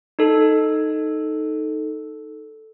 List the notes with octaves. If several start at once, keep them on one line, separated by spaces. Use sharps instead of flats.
D#4 A4